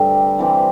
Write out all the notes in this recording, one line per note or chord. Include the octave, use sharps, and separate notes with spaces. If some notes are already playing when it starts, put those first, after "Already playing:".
Already playing: G2 D3 G3 A3 C4
E3 G3 C4 G4